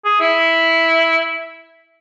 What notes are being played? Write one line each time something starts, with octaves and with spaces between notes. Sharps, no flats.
G#4
E4